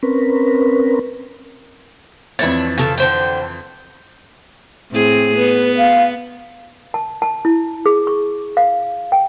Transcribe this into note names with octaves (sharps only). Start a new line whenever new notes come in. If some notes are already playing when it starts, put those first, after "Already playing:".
C4 C#4 A#4 B4
F2 E3 D4 E4 C#5 A6
C#3 A4
D3 C5 G5
A2 C4 G#4
B3 B4
F5
A5
A5
E4
G#4
C#6
F5
G5